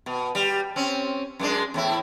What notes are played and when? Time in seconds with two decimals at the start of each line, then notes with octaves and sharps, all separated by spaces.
0.06 B2
0.35 G3
0.76 C4 C#4
1.39 F#2 G#3 D4
1.74 E2 A2 E4